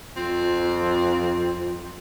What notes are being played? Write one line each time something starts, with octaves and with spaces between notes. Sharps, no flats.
F2 C4 F4